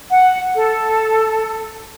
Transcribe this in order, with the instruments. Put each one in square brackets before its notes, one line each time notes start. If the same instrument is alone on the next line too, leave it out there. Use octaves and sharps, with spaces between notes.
[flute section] F#5
A4